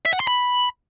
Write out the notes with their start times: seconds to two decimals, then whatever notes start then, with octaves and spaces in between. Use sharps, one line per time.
0.05 E5
0.13 F#5
0.20 C6
0.28 B5